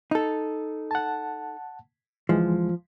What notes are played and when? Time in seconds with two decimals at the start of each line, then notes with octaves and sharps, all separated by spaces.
0.11 D#4 A4
0.91 F#5 A5
2.29 D2 E3 F3 G#3